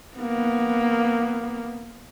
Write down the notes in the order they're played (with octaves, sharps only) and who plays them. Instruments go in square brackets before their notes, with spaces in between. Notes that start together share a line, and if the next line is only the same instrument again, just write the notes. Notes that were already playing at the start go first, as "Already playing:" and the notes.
[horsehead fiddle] A#3 B3